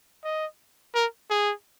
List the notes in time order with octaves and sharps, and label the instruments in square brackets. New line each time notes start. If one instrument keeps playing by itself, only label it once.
[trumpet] D#5
A#4
G#4